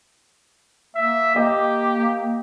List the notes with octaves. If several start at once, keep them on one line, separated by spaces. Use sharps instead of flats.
A#3 E5
A#3 G4 D#5
A#3